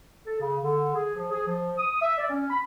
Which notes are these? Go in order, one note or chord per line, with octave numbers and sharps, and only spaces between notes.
A4
C#3
D3
G#4
F3
G#4
F3
D#6
E5
D5
C#4
B5